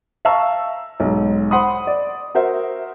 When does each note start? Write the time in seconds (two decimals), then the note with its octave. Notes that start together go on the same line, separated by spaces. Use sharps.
0.25 E5 F5 A5 A#5 C#6 E6
1.00 B1 G#2
1.51 C5 F#5 B5 C6 D#6
1.87 D5
2.35 F#4 A#4 C5 E5 F#5